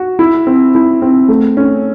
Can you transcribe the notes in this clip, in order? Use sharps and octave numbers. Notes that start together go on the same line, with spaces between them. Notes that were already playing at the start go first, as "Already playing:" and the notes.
Already playing: F#4
E4
C4
E4
C4
A3
C#4